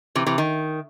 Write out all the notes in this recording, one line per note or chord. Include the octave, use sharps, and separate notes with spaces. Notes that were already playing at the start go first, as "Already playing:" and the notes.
C3 E3
C3 E3
D#3